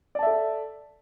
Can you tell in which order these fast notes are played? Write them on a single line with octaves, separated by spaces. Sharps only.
D5 A5 E5 A4